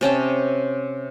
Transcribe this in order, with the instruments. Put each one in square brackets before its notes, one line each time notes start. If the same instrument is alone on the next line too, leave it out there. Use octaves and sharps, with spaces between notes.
[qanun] C3 C#4 G5 A5